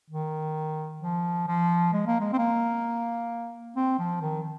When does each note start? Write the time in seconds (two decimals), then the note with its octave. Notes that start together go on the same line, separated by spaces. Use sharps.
0.10 D#3
1.02 F3
1.48 F3
1.93 G#3
2.07 A#3
2.20 G#3
2.33 C4
2.38 A#3
3.76 C4
3.99 F3
4.21 D#3